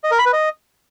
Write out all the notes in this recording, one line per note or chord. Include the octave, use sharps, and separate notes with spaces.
D#5
A#4
B5
B4
D#5